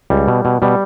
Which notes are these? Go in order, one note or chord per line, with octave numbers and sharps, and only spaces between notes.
C#2 G3
B2
B2
B2 G3